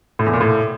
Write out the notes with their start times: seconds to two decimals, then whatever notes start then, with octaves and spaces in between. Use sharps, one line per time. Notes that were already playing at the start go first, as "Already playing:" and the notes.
0.19 A2
0.26 E2
0.33 A#2
0.41 A2